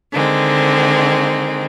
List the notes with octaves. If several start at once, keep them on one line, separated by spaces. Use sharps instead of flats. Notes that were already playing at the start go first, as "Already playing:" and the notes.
D3 D#3 G#3 C4